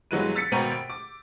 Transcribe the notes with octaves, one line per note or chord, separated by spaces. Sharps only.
G1 E3 F#3 G#3 F#6 D#7
E6 A6 B6 C#7
G#1 B2 A#4 G5 D#7
D7
D6